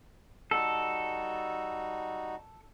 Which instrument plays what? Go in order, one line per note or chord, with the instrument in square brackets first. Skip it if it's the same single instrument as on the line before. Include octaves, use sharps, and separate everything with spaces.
[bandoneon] G3 D#4 F#4 [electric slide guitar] A4